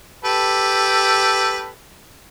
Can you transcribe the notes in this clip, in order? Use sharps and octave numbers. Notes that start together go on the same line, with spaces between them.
G4 A4 B4